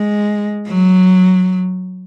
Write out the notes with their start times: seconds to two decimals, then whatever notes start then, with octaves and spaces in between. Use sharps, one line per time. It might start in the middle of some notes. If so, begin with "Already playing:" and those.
Already playing: G#3
0.69 F#3